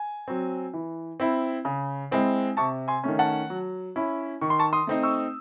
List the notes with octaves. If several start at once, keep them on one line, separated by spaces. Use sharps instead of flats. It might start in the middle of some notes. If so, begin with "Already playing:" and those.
Already playing: G#5
F#3 C4
E3
C4 E4
C#3
G#3 C4 E4
C3 A5 C#6
G#5 C6
D#3 A3 C#4
F#5 A5
F#3
C#4 E4
D#3 C#6
C6
A5 C#6
C6 D#6
A3 C4 D#4
C#6 E6